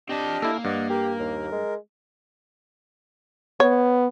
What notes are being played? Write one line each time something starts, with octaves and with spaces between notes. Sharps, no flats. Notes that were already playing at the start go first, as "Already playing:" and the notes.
C4 D4 G4 D#5 A5
A#3 E4 A4
G2 D5 D#5 F#5
G4 A#4
D#2
G#3
B3 C#5